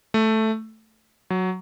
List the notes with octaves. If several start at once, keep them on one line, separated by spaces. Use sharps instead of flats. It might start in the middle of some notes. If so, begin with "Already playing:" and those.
A3
F#3